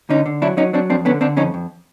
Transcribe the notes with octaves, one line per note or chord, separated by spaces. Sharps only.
D3 C#4 D#4
D3
F#3 D4 E4
F#3 C#4 D#4
F#3 C4 D4
F2 C4 D4
D3 B3 C#4
D3 C4 D4
F2 C#4 D#4
F2